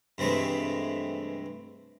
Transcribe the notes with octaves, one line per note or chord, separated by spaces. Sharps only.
G2 C3 E3 G#3 A3